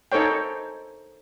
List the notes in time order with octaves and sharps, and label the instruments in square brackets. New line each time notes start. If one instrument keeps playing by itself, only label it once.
[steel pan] D#4 A4 C5 C#5 G5